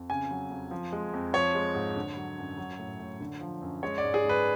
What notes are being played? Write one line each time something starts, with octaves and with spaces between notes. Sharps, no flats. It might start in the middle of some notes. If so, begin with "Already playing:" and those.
Already playing: F2
C#3 G#5
F#3
F2
F3
G#3
F2
F3 C#5
G#3
G#2
D3
F#3
F#2
F#3
A2
A2
D3
F3
F#2
G#3 C#5
D5
G#2
G#4
G#2
B4